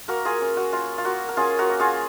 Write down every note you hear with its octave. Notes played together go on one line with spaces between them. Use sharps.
A#3 F#4 A#4
F4 G#4
C#4
F#4
A#3 F4
F4
A#3 F#4
A#4
C#4 F4 G#4
F#4 A#4
A#3
F4 G#4